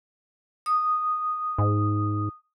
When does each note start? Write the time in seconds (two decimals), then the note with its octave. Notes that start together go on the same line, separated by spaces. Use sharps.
0.66 D#6
1.58 G#2